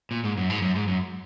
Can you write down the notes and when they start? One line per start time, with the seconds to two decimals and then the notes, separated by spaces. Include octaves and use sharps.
0.11 A#2
0.24 G#2
0.37 F#2
0.50 G#2
0.62 F#2
0.75 G#2
0.88 F#2